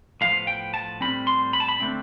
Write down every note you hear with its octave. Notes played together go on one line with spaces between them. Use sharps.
A2 F3 B3 F5
G5
A5
A2 G3 C4 B5
C6
B5
A5
B5
D3 A3 C4